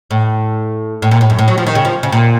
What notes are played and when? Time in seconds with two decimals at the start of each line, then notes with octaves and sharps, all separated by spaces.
0.11 A2
1.02 A2
1.11 A#2
1.21 A2
1.30 F#2
1.39 A2
1.48 F#3
1.58 F3
1.67 D#3
1.75 C#3
1.85 F3
2.03 C#3
2.12 A#2